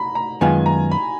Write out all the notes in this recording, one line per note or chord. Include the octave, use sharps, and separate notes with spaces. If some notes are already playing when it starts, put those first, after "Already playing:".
Already playing: A#5 B5
A#5
F#2 D#3 G#3 B3 F4 G#5
A#5
B5